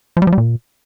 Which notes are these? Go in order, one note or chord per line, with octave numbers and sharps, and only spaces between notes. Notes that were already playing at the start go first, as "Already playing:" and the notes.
F3
G3
F3
G3
A#2